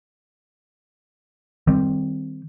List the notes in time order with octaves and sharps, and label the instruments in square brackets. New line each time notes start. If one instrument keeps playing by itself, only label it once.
[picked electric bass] D#3 G3 C4